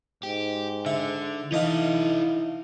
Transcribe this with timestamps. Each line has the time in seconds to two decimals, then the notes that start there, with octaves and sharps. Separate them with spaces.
0.23 G#2 G4
0.86 D3 E5
1.52 E3 D#4 E4 A4 D#5 F5